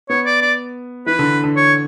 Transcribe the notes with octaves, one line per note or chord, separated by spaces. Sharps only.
B3 C#5
D5
D5
E3 B4
D3
D3
C#5